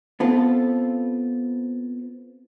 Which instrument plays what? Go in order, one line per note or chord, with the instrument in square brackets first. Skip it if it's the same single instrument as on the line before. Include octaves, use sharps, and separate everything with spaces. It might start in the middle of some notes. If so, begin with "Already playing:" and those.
[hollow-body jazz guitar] B3 C4 F4 A4